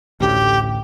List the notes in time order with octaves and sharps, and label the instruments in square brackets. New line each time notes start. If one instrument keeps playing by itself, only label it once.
[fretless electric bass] A1 D2 A2 [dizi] G4